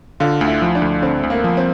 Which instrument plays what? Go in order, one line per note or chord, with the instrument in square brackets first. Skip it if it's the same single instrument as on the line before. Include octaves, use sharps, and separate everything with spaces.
[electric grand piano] D3 [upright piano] F4
[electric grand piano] D2
[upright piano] E4
[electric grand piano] F3
[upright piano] D4
[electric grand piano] D2
[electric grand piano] D3 [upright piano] C4
[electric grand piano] D2
[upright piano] A#3
[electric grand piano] F3
[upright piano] C4